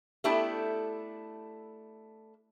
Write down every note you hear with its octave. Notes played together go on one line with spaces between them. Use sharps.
A3 B3 D4 E4 G4 A4